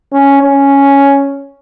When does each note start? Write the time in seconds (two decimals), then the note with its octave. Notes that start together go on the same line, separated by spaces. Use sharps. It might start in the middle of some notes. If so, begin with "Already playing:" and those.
0.13 C#4
0.43 C#4